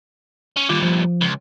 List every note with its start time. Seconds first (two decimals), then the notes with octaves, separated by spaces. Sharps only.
0.56 C#4
0.69 G2 A#2 D#3 F4 D6
0.83 F3
1.21 C#2